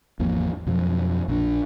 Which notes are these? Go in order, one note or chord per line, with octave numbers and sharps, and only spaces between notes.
G#1 E2 F3 A#3
F2 B2 F3 F#3
A#1 D4